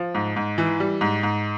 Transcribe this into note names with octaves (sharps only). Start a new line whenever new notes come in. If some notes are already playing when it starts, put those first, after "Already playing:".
Already playing: F3
G#2
G#2
E3
G3
G#2
G#2